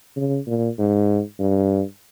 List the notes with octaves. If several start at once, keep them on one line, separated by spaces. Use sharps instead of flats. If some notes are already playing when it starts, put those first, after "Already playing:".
C#3
A#2
G#2
G2